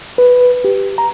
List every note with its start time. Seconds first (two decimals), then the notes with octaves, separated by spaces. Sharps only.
0.18 B4
0.64 G4
0.98 A#5